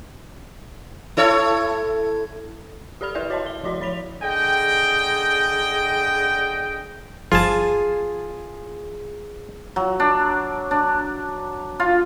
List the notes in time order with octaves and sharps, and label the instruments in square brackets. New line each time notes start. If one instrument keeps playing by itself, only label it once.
[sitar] E4 A4 C#5
[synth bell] G4 A4 D5 B5 F6 F7
E4 A#4 B4 D5 E5
F#4 C#5 D#5 E5 A5 C6
G7
F3 E4 F#4 D5 D#5 C6
F3 C#5 B5 B6 F7
[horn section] D3 G#4 D#5 G5
[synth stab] G1 F3 [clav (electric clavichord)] F4 A5 [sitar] G#4
[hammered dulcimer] F#3
D4
D4
F4